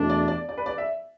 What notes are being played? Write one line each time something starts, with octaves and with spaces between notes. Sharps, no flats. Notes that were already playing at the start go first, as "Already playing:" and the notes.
Already playing: E2 B2 A3 D4
D5
D5
D5
B4
D5
E5